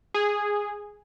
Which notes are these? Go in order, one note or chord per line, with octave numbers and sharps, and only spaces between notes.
G#4